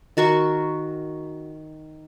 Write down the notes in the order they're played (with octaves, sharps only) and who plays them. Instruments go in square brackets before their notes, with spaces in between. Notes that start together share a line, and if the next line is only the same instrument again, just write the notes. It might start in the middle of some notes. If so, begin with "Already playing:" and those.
[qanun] D#3 F#4 A#4 C#6